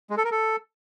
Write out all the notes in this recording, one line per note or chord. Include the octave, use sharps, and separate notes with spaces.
G#3
A4
A#4
A4